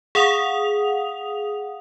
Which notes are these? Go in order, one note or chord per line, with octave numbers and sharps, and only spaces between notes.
G#4 F5 F#5 D#6 F7